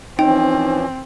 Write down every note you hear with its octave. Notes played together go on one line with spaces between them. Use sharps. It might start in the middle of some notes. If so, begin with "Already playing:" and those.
E3 F3 C4 C#4 D#4 G5